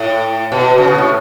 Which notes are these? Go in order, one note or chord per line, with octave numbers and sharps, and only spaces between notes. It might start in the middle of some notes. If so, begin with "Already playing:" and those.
Already playing: A2
B2
C#3
B2
A2